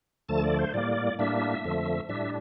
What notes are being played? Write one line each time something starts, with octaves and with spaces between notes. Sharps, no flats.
D2 D3 F3 A3 A5
D5
C5
A2 G3 A#3 D5
A2 G3 A#3 D4 E5
F2 D3 F3 A3
A2 G3 D4 E5